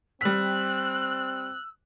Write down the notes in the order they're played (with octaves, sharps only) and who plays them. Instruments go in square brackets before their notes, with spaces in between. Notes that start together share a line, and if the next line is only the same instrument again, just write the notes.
[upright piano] G3 B6 [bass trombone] C4 [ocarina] E6 [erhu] F#6